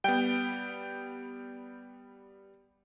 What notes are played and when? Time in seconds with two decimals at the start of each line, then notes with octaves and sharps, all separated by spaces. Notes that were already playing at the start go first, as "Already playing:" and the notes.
0.04 G3 B3 G5